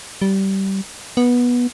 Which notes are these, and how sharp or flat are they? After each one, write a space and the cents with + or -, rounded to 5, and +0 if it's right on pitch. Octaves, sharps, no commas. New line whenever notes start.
G3 -20
B3 -15